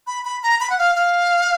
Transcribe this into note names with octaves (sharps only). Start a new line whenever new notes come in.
B5
B5
A#5
B5
F#5
F5
F5